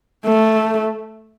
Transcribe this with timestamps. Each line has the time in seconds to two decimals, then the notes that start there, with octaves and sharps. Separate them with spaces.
0.25 A3